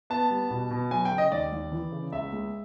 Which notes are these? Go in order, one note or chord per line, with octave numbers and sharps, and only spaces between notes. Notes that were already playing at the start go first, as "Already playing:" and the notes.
B3 A5
G3
B2
B2
F#3 G#5
G5
C#3
D#5
D#2 D5
D#2
E3
C#3
C#2 E5
G#3